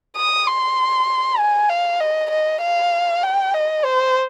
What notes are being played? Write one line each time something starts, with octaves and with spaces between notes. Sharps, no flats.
D#6
C6
G#5
F5
D#5
D#5
F5
G5
D#5
C5